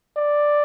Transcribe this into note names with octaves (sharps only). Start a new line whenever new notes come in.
D5